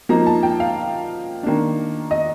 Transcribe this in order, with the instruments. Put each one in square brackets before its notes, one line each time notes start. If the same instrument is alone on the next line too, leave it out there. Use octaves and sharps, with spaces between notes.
[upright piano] F3 A#3 D#4 A#5
A5
G5
F5
D#3 A#3 D4
D#5